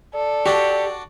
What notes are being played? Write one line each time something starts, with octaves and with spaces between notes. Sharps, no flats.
A4 D5
D4 F#4 G4